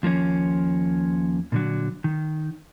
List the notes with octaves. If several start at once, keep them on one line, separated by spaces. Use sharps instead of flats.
D#2 F3 A#3 C#4
A#2 D3 F#3
D#3